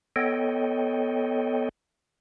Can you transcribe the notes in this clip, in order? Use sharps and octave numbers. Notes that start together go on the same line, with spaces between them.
B3 A4 C#5 D#5 G5